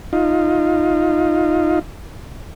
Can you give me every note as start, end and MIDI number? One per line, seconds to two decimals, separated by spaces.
0.13 1.79 63
0.13 1.79 65